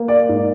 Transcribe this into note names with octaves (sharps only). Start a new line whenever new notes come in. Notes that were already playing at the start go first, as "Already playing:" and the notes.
Already playing: A#3
D5
G#2